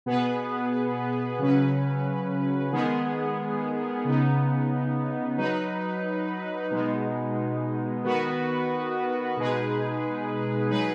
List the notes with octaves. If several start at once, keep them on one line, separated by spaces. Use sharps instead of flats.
B2 B3 G#4 B4
C#3 F#3 C#4 B4
D#3 G#3 B3 G#4
C#3 B3 D#4
F#3 D#4 B4
B2 G#3 B3 D#4
D#3 B3 F#4 B4
B2 G#3 D#4 G#4 B4
F#3 D#4 G#4 B4